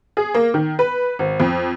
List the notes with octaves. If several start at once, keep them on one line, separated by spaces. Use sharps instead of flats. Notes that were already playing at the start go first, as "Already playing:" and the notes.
G#4
A#3
D#3
B4
G#1
F2